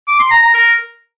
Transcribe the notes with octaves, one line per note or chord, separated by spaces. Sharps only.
D6
C6
A#5
A#5
A#4